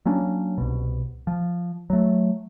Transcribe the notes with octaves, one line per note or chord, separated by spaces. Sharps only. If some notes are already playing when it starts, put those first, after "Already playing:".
F#3 A#3 C#4 D4
C2 B2
F3
F#3 A3